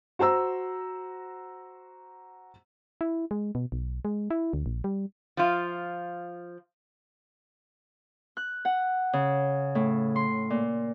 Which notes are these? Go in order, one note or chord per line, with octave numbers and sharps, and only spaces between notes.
F#4 C5 A#5 E6
E4
G#3
B2
B1
G#3
E4
D2
A#1
G3
F3 F4
F#6
F#5
C#3
A2
C6
A#2